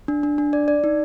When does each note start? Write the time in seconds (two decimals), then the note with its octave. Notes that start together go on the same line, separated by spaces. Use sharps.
0.08 D4
0.23 D4
0.38 D4
0.53 D5
0.68 D5
0.84 D#4